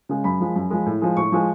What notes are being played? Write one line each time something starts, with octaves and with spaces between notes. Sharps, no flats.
C#3 G#3
F#2 B5
F3 G#3
F#2
F3 G#3
A2
F3 G#3
A2 C#6
F3 G#3